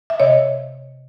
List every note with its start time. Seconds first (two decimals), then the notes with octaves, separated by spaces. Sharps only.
0.10 E5
0.20 C3 C#5 D#5